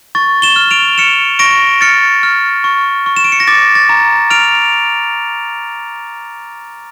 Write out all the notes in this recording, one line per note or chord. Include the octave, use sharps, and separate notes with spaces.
C#6 A6
E7 G7
F6
D7 F7
F6 C#7 E7
C#6 A#6 D7
F6 A6 C#7
F6
C#6
C#6
E7
D7
C#7
A#6
D6 A6
A6
A#5
F6 D7 F7